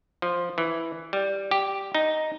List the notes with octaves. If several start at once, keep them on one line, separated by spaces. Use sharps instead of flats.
F3
E3
G3
G4
D#4